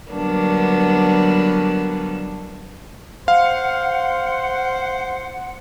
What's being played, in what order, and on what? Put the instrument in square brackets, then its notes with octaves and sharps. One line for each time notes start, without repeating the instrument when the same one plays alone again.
[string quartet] D3 F#3 G3 A#3 B3 D4
[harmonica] C5 [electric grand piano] F5 [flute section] F#5